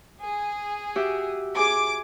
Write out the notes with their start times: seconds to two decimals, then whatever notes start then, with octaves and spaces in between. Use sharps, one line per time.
0.22 G#4
0.96 F#4 G4 E5
1.55 G#4 G#5 D6